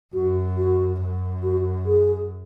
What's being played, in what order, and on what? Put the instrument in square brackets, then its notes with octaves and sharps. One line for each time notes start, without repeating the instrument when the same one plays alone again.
[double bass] F#2 [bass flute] F#4
[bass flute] F#4
[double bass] F#2
[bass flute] F#4
G#4